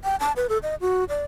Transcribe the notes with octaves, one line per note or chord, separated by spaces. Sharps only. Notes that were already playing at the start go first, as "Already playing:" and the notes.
G5
A5
B4
A4
D#5
F#4
D5